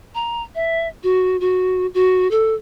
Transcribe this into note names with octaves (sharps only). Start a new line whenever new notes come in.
A#5
E5
F#4
F#4
F#4
A4